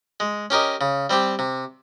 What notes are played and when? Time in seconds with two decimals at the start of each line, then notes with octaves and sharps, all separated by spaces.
0.20 G#3
0.50 C#4 G4 A#4 D#5
0.81 C#3
1.10 G3 C4 G4
1.39 C3